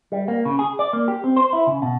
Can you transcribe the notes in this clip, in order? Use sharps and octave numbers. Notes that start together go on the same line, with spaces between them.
G3
A#3
C#3
G#4
D5
A#3
G4
C4
C5
E4
C#3
B2